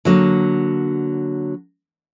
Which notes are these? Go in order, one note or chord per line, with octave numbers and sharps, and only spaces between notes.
D3 F#3 A#3